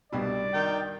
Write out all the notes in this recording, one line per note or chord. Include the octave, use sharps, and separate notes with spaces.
C2 G2 B2 D5
D#3 G5